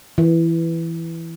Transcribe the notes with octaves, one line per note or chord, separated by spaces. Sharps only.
E3